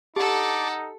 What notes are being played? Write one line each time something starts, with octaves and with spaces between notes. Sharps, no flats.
D#4 G4 A4 F#5 A5 D6